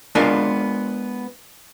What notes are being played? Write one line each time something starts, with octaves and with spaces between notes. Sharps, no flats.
G#3 B3 D4 F4 A#4 F5